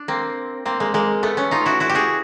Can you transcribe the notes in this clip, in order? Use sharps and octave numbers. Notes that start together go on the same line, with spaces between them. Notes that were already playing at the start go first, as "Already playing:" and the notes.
Already playing: D4
A#3 C4
A#3 C4
G#3 A#3
G#3 A#3
A3 B3
B3 C#4
D#4 F4
E4 F#4
E4 F#4
G4
F#4 G#4